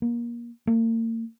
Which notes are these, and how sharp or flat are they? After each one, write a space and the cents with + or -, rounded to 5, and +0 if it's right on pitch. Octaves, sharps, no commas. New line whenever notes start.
A#3 +25
A#3 -40